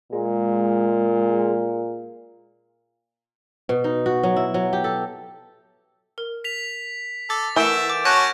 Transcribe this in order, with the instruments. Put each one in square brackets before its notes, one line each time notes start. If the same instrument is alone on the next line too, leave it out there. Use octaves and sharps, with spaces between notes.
[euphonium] A#2 [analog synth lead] G#3
[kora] B2
D#4
F#4
F#3
E4
F#3
G4
A4
[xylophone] A#4
[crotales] B6 F7
[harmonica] A4 [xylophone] D6 [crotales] A6
[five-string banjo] E3 A3 [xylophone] A#4 F#5 [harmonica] E5 [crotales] G6 D7 E7
[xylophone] D6
[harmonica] C#4 F#4 C#5 [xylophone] A5 F#6 [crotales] G6 A#6 D#7